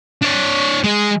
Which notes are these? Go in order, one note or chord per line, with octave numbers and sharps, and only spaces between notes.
D4 C#5
G#3 G#4